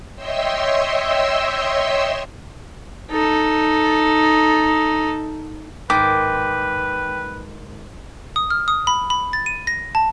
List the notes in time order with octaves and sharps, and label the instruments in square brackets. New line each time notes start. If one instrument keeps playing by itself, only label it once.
[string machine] C#5 D#5 E5 G5 C6 E6
[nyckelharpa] D#4 A4
[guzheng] G#2 D#3 [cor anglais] B4 [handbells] G5 G6 B6 [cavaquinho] D6
[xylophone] D#6
F6
D#6
B5
B5
A6
D#7
A#6
A5